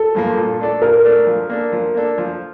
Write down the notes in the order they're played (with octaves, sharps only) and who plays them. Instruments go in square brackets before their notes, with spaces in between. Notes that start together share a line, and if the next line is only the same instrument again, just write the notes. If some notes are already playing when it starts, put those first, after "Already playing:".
Already playing: [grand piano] A4
[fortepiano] G2 F3 A#3
A#2
A3 D4 A4 D5
[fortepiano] A#2 [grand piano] A#4
[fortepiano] A3 D4 A4 D5
F3
A#3 D4 A4
F3
A#3 D4 A4
F3